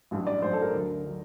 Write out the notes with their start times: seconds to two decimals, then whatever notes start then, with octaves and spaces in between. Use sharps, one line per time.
0.11 A1 G2 F#3
0.27 D5
0.42 A1 G2 F#3 C5
0.53 A4
0.62 A#4
0.73 D2 D3 F#3
1.05 D3 F#3